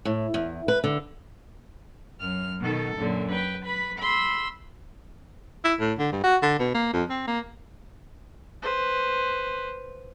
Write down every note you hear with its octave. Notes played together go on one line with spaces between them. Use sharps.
A2
E2
B4
D3
F#2 F6
B2 D#3 A4
F#2 A#2 D3
B4 G5
B4 B5
B5 C6 E6
E4
A2
D3
G2
F#4
D3
B2
A#3
F2
C4
A#3
B4 C5